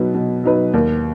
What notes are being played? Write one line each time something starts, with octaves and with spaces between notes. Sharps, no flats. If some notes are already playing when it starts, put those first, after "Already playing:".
Already playing: B2 F#3 D#4 B4
B2
F#3 D#4 B4
D#2